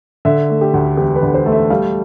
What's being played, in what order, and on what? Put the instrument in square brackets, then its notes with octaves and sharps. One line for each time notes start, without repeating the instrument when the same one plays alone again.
[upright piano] D3 E5
A3
G4
D2
E1 G4
B4
D3
C5
A3
E5
G3 F5